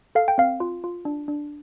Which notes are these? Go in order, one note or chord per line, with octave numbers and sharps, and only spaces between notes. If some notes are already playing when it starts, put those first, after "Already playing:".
A4 F5
G5
C4 F5
F4
F4
D4
D4